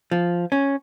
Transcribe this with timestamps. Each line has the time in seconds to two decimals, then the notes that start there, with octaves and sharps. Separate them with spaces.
0.11 F3
0.52 C#4